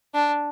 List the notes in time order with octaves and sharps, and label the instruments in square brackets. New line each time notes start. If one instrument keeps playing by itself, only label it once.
[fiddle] D4